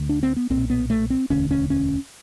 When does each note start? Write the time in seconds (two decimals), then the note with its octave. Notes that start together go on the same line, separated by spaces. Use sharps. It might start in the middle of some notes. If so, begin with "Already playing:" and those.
Already playing: D2 D3
0.09 D4
0.23 C4
0.36 B3
0.50 B1 A#2 C4
0.70 B3
0.90 A3
1.10 C4
1.30 E1 D2 D3 C#4
1.51 C#4
1.70 C#4